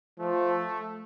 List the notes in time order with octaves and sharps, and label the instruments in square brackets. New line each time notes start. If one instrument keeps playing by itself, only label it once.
[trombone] F3 [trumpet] A3